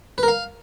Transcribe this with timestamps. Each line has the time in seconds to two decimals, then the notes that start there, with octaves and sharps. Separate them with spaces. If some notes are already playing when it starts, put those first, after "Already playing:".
0.18 B4
0.23 A#4
0.28 F5